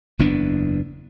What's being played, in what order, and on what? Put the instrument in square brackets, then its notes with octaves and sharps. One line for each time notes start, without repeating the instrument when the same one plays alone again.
[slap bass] F#1 E2 B3 D4